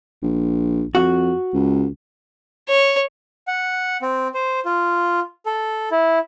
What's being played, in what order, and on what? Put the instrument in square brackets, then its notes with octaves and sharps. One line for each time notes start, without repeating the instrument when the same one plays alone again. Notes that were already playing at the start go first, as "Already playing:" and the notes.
[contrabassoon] A#1
[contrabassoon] F2 [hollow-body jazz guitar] F#4
[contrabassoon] C#2
[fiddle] C#5
[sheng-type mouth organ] F#5
C4
C5
F4
A4
E4